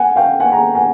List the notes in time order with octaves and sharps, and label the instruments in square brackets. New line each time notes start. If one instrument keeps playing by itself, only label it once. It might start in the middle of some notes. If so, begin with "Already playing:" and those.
Already playing: [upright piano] F#5 G#5
F5 G5
F#5 G#5
G#5 A#5
F#5 G#5